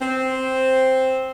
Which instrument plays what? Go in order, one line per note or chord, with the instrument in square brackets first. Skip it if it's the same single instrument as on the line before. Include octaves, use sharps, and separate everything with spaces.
[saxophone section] C4